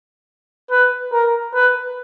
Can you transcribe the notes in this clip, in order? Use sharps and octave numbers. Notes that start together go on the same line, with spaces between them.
B4
A#4
B4